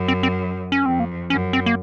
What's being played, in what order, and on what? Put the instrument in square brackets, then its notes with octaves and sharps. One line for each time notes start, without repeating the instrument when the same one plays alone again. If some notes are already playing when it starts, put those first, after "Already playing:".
Already playing: [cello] F#2
[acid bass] C4
C4
C#4
[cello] F2 [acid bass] C4
[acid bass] A#3
[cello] F#2 [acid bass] C#4
[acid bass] C4
A#3